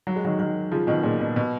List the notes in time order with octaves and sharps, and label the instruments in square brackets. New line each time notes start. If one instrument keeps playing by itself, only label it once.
[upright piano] F#3
G#3
D#3 F#3
D#3 F#3
C#3 F3
B2 D#3
A#2 C#3
B2
B2